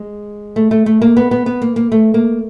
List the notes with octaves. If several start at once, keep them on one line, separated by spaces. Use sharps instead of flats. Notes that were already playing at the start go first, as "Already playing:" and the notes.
Already playing: G#3
A3
A3
A3
A#3
B3
B3
B3
A#3
A#3
A3
A#3